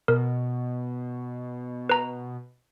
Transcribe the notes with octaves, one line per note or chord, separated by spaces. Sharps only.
B2 A#4
B4 A#5